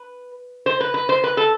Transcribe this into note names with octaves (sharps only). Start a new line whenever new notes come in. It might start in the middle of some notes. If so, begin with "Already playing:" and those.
Already playing: B4
C5
B4
B4
C5
B4
A4